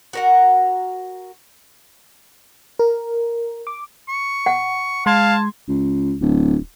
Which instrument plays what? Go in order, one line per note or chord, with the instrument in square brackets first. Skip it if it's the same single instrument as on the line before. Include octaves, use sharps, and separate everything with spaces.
[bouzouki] F#4 A#4 F#5
[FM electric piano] A#4
D6
[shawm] C#6
[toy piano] F#5
[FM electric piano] G#3 C6 G#6 [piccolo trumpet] F5 [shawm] A5
[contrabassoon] C#2
D1